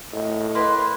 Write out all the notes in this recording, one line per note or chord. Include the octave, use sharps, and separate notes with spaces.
A2 D#5
A#3 B4 C6